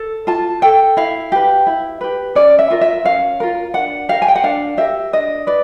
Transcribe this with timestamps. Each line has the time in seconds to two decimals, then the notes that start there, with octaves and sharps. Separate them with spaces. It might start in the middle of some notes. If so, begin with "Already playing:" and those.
Already playing: A4
0.27 F4 A5
0.62 A4 G5
0.97 E4 F5
1.32 G4 B4
1.67 E4
2.01 G4 B4
2.35 C#4 D5
2.59 E5
2.70 F4 A#4
2.81 E5
3.04 C#4 F5
3.40 F4 A#4
3.74 D4 F#5
4.09 G4 A#4 F5
4.22 G#5
4.28 G5
4.36 F#5
4.44 D4 F5
4.77 G4 A#4 E5
5.13 D4 D#5
5.47 B4 D5